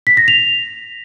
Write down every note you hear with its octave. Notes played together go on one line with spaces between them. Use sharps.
B6
A#6
F7